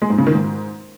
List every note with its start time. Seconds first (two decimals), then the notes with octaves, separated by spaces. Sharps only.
0.02 G#3
0.10 G#2
0.18 C#3
0.27 D#3
0.35 G#2